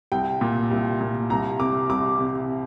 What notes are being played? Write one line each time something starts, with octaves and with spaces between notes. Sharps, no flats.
C2 G5
A#2
C2
A#2
C2 A#5
C3 D6
C2 D6
C3